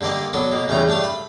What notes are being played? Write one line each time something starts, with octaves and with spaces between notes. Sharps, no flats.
G2 D3 A#3 D5 D#5
F#3 B3 D4 A4
B2 A#3
E2 C#3 G3 A3 A#5
G2 A3 D4 F5 A5
B5